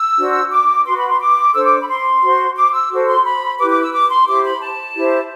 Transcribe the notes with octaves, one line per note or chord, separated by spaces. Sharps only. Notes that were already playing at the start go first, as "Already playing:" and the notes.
Already playing: E6
D4 F#4 C5
D6
F#4 B4 C6
B5
C6
D6
D4 A4 C5 E6
D6
B5
C6
F#4 C5
D6
E6
F#4 A4 C5
C6
B5
E4 G4 B4 D6
D6
E6
D6
C6
E4 G4 C5 D6
B5
A5
E4 G4 C5